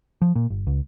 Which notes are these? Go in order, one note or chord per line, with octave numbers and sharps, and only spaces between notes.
F3
A#2
G1
C#2